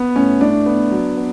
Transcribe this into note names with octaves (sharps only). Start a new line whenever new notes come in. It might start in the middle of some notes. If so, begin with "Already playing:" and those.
Already playing: B3
A2 C#4
A2 D4
B3
F#3
B3